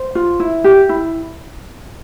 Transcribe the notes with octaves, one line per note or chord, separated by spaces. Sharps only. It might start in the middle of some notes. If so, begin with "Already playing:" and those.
Already playing: C5
F4
E4
G4
E4